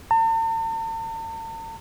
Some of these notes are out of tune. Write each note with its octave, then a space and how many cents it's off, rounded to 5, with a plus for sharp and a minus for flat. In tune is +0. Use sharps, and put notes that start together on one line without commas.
A5 +45